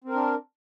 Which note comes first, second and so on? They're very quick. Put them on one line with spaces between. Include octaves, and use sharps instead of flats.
C4 A#4 D4